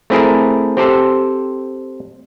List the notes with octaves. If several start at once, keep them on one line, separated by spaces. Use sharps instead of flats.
A3 C4 E4 G#4 A#4
C4 G4 A4 C5